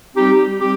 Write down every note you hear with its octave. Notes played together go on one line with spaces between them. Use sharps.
G3 C4 D#4 G4
G3 C4 G4